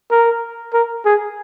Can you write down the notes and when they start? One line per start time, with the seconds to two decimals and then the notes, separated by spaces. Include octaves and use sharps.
0.11 A#4
0.73 A#4
1.05 G#4